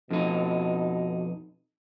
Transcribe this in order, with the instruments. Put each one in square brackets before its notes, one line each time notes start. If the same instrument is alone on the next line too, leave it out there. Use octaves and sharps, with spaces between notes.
[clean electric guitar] F2 D#4 [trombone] B2